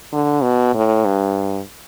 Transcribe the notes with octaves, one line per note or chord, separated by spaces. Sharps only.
D3
B2
A2
G2